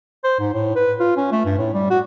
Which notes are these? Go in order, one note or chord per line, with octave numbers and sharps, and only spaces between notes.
C5
G#2
A2
B4
F4
C#4
A3
G2
A2
G3
F#4